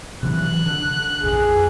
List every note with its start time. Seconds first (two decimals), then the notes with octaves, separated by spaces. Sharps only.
0.23 C3 E3 F#3 F#6
0.66 D3
1.23 A#1 F2 G#4